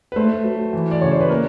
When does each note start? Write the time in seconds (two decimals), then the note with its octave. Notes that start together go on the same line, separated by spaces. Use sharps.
0.12 B4
0.16 A3 C5
0.44 F#3
0.73 E3
0.91 D5
1.01 C#3 C#5
1.11 C5
1.21 B4
1.29 A#3 A#4